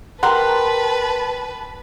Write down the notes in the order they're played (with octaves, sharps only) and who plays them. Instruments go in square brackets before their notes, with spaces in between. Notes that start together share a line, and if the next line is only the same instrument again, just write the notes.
[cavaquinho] G4 C6 [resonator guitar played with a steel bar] A#4 F#5 [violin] B4 [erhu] A5